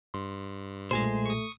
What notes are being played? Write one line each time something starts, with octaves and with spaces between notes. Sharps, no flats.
G2 C6
B1 A#2 G#3 A3 G#4 C5
C#6 D#6